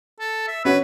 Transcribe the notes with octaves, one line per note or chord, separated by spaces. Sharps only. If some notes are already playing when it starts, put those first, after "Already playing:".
A4
E5
C#4 F#4 B4 C#5